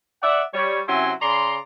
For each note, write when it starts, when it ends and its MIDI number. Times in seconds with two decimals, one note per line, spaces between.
0.23 0.43 74
0.23 0.43 76
0.23 0.43 78
0.54 0.82 55
0.54 0.82 73
0.88 1.12 48
0.88 1.12 54
0.88 1.12 61
0.88 1.12 64
0.88 1.12 80
0.88 1.12 84
1.22 1.58 49
1.22 1.58 74
1.22 1.58 82
1.22 1.58 84